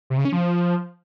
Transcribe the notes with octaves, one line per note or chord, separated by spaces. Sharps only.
C3
C#3
C#4
F3